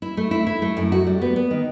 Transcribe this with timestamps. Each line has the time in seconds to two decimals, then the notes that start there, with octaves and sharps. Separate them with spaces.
0.02 E4
0.17 A3
0.31 E4
0.47 E4
0.62 A3
0.77 F#2
0.92 F#4
1.07 G3
1.22 B3
1.36 B3
1.51 D#3